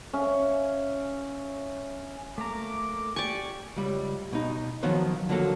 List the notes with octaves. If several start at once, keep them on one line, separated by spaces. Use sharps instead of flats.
C#4 E5 F5
A3 A#3 A#5 D6
G4 D5 G#5 C#6
C#2 G3
B2 D#4
D#3 F3 F#3 B3 C5
D3 F3 F#3 A#3 F#4 A4